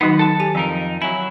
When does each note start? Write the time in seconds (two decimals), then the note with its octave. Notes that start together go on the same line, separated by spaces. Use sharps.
0.01 D#3 F#3 B3 D#4 F#4
0.19 A4 A5
0.40 G4 G#5
0.55 F2 F3 D#4 A#4
1.02 F#3 E4 G#5